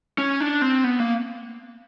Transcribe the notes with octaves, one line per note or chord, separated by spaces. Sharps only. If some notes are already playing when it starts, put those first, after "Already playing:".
C#4
D4
C4
B3
A#3